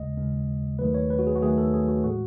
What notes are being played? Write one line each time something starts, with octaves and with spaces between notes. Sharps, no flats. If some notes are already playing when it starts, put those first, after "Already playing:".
Already playing: D#2 C#3 G#3 D#5
D#2 C#3 G#3
D#2 D#3 F#3 A3 B4
C#5
B4
F#4
G#4
F#4
D#2 D#3 F#3 A3 G#4
A4
G#4
F#4
A2 E3 G#3 F#4